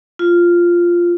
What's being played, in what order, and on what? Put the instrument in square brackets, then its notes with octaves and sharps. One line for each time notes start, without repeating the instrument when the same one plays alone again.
[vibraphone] F4